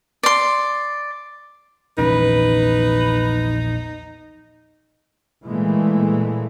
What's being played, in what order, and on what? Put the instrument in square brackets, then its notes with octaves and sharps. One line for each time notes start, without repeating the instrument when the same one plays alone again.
[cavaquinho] D5 C6
[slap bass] A#1 E2 C#4 [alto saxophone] D#4 [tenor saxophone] B4
[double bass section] A#2 E3 G#3 A3